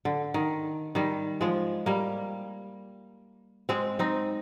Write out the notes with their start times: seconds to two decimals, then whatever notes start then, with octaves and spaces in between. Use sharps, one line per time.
0.05 D3
0.34 D#3
0.95 D#3 G3
1.41 F3 G#3
1.86 G3 A#3
3.69 G#3 C4
3.99 C4 D#4